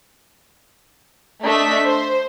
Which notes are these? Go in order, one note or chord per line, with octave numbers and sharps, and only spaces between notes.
A3 D4 D#5 E5 B6
C5